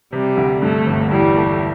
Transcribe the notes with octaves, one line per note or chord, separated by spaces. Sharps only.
C3 G3
D2
G2 A3
G1
E2 G3
A3